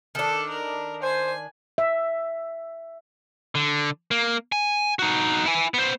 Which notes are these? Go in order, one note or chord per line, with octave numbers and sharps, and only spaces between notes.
D#3 D4 A4
A#4
C5 G#5
E5
D3
A#3
G#5
D#4 F#4
E4 G#5
B3 C5